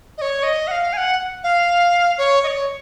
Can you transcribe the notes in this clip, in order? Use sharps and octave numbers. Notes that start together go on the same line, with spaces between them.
D#5
C#5
D#5
F#5
F5
G#5
F#5
F5
C#5
D#5
C#5